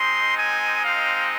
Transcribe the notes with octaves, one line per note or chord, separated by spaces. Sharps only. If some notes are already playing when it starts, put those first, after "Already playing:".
Already playing: G#3 C4 D#4 C6
G#5
F5